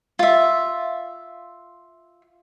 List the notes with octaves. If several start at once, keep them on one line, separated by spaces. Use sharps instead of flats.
F4 E5